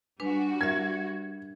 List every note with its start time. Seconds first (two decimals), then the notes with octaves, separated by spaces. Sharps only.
0.20 G3 D4 F#4 B4 G#5
0.61 A#4 E5 G#6